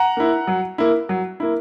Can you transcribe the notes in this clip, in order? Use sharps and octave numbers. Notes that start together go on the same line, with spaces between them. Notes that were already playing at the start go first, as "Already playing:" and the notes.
Already playing: F#5 A#5
A#3 E4
F#3
A#3 E4
F#3
A#3 E4